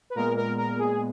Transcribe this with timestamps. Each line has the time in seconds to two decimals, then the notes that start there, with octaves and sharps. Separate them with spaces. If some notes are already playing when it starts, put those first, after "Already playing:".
0.10 B4
0.15 A#2 G#3 B3 A#4
0.37 A#4
0.58 A#4
0.79 G#4